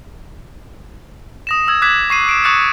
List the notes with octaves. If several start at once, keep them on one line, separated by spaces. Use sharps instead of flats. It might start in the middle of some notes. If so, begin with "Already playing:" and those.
D#6 A#6 E7
D#6 E6 G#6
D6 F#6 G#6 B6 E7
C#6 C7 D#7
D7 E7
C#6 D#6 F#6 A6 C#7 E7